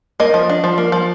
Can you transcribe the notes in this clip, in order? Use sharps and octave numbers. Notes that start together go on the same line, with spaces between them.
A#3 D#5
F3
D4
F3
A#3
F3